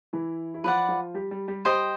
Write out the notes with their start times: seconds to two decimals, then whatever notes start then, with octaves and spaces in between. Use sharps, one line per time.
0.13 E3 E4
0.54 E4
0.63 F3 F4 B4 D5 F#5
0.88 F3 F4
1.14 G3 G4
1.31 G3 G4
1.48 G3 G4
1.65 G3 G4 C5 D#5 G5